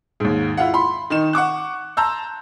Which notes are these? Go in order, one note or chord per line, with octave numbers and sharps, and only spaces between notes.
D#2 G#2
E4 F4 F5 F#5
B5 C6
D#3 D#4 E7
F#5 C#6 D6 F#6
A5 A#5 C6 E6 G6